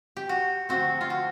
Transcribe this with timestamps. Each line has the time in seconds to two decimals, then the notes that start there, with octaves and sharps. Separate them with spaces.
0.16 G4
0.29 F#4
0.69 D3 F3 A3 C4 F#4
1.01 F4
1.10 F#4